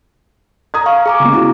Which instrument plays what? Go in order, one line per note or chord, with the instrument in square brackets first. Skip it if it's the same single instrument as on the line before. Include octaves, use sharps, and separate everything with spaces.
[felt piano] A#5 D#6 G#6
[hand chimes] F5 C#6
G#4 A#5 D6
[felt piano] C#3 G#3 A#3
[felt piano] B3 F#4 [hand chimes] E4